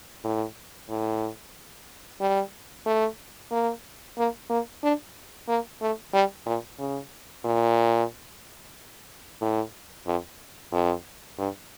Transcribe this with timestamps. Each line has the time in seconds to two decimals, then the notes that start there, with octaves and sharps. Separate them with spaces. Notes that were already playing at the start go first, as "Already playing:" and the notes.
0.24 A2
0.89 A2
2.21 G3
2.86 A3
3.51 A#3
4.18 A#3
4.50 A#3
4.83 D4
5.48 A#3
5.81 A3
6.13 G3
6.46 A#2
6.79 C#3
7.44 A#2
9.41 A2
10.06 F2
10.72 F2
11.38 G2